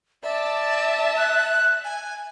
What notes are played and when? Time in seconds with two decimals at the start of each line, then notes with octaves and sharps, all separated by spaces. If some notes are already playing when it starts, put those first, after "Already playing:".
0.23 D5 E5 A5
1.17 F#6
1.85 G#5